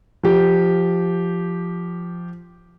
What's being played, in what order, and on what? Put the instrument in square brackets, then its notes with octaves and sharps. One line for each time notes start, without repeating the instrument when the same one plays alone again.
[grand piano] F3 G4